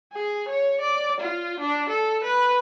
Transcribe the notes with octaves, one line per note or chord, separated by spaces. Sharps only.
G#4
C#5
D5
F4
D4
A4
B4